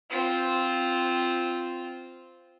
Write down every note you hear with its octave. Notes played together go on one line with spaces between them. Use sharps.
C4 F4